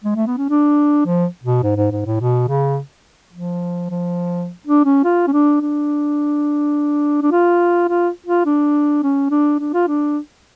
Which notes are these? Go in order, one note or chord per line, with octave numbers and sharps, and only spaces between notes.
G#3
A3
B3
C#4
D4
F3
B2
G#2
G#2
G#2
A2
B2
C#3
F3
F3
D4
C#4
F4
C#4
D4
D4
D4
F4
F4
F4
D4
C#4
D4
D4
F4
D4